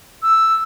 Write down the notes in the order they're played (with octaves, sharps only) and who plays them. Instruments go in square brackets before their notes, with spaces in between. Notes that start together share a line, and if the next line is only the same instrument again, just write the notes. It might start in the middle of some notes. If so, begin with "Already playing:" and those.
[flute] E6